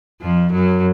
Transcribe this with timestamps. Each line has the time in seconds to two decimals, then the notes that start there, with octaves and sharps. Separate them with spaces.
0.21 F2 F3
0.52 F#2 F#3